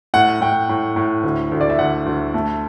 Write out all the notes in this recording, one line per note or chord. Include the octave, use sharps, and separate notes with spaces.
A2 F#5
A2 G5
A2
A2
D2
D2
D5
E5
D2 F#5
D2
A3